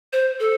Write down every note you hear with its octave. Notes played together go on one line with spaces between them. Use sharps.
C5
A4